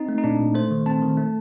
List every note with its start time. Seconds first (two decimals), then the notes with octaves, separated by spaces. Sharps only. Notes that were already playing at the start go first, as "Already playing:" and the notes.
Already playing: C4 D#4
0.09 A3
0.18 D#4
0.24 A#2 D4
0.40 A#2
0.55 A3 C5
0.71 D#3
0.86 C4 A5
1.02 D#3
1.17 A3